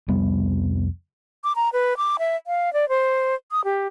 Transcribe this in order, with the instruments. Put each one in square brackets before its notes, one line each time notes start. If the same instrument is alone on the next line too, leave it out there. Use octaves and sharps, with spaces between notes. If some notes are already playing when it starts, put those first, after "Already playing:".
[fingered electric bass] C2 F2 G3 B3
[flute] D6
A#5
B4
D6
E5
F5
D5
C5
D#6
G4